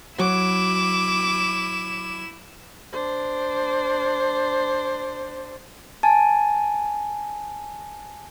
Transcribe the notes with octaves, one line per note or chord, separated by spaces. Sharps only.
F#3 E4 D6 E7
D4 C5
G#5 A5